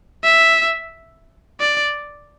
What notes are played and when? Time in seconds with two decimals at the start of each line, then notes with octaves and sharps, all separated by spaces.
0.24 E5
1.60 D5